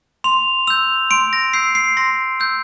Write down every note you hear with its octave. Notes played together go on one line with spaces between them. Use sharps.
C6 F7
E6 G6 F7
C6 D7
A#6
E6 G6 C7
C7
C6 A#6
E6 G6